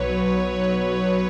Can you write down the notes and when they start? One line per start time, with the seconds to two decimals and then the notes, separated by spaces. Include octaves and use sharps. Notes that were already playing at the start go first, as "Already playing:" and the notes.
Already playing: B1 F#3 B4 C#5
0.23 B1